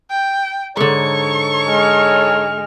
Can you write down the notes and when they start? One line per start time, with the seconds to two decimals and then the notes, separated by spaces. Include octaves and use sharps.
0.10 G5
0.77 G#2 D3 D#4 A4 C#5 C#6
1.69 G#3 F6